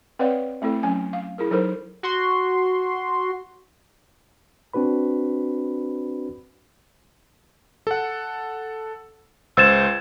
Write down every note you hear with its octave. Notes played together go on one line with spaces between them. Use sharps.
C4 B4 C#5 D5 F5 F#5
A3 C4 E4 A4
F#3 C#4 G#5
F5
E4 G#4 A#4
F#3 D#4 A4 A#4 C5 B5
F#4 C6
C4 D4 F#4 B4 B5
A4 F#5
C#2 C5 E6 G#6 A6 E7